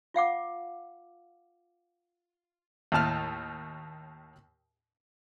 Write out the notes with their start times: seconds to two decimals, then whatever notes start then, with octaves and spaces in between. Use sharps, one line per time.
0.14 F4 F5 F#5 D6
2.92 D#2 A2 A5 F6